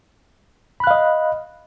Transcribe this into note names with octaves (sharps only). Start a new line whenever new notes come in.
D#5 F5 B5 F#6